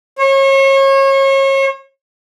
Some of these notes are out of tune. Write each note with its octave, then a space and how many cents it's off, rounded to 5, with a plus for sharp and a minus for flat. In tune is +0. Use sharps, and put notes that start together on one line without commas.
C#5 -35